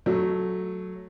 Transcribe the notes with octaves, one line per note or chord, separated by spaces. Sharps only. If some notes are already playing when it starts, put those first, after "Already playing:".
F#3 A3